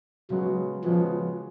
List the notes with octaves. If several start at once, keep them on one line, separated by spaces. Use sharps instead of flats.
C#3 F#3 G#3 B3 F#4
C#3 F3 G#3 B3 F#4